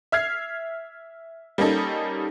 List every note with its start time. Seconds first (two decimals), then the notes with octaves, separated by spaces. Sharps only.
0.12 E5 F6 G#6 C7
1.58 G3 A#3 C#4 D#4 A4